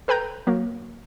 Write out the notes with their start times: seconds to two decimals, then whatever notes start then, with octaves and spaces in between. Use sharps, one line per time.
0.08 A4 B4 G5 A#5 G6
0.47 F#3 A#3